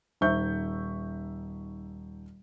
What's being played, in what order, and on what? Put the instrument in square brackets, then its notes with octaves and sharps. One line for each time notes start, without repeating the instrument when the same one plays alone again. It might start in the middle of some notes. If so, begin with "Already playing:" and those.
[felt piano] D#1 D#4 C5 E5 C#6 G6